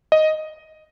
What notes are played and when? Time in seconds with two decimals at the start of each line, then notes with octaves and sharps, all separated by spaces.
0.12 D#5